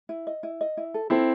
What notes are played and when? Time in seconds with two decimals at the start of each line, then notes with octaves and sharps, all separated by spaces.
0.09 E4
0.27 D#5
0.43 E4
0.61 D#5
0.77 E4
0.94 A4
1.10 C4 E4 A4